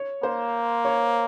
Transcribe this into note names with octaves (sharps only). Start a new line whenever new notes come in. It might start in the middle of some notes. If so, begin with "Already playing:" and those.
Already playing: C#5
A#3 C5
C#5